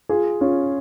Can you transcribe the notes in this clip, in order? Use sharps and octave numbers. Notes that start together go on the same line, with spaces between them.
F4 G#4
C#4 F4